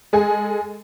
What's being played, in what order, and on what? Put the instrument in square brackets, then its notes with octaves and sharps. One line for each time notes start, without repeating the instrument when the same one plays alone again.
[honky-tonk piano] G#3 G#4 A4 G#5